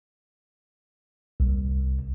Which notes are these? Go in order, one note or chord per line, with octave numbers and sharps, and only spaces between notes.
C2